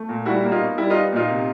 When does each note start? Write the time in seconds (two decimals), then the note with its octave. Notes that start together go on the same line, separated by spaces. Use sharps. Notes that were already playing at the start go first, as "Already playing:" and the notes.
Already playing: A3
0.09 A#2
0.25 G3 E4 F#4
0.43 A#3
0.51 D#4 F4
0.61 B2
0.78 G3 E4
0.90 D#4 F4
0.95 B3
1.12 A#2 D#4 F4
1.29 C3